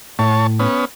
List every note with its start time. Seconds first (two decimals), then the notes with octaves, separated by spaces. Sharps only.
0.19 A2 C#5 A5
0.59 B3 C#4